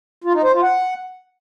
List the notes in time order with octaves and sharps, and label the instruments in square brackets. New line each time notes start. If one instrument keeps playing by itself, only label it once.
[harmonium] F4
D#4
C5
F4
F#5